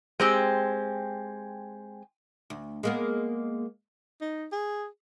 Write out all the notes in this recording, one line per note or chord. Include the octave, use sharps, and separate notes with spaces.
G#3 C4 G4
D2
G#3 A#3 B3
D#4
G#4